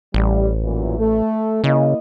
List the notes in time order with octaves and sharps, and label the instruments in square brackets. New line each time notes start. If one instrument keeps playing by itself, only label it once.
[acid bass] A1 [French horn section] G3
[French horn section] F#2 A#2 E3
A3 A4
[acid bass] C#3 [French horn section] A#3 E4 D#5